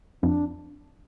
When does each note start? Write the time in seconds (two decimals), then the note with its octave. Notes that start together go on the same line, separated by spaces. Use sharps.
0.23 F2 D4